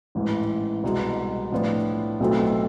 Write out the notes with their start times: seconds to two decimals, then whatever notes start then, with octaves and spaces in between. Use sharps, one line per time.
0.15 A1 G#2 E3
0.84 C2 B2 G#3
1.52 A2 F3 B3 D4 F4
2.20 B1 B2 A3 C4 F4